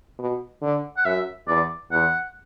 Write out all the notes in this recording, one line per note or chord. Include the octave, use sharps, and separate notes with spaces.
B2
D3
F#5
F#2 E5
E2 D5
E2 F#5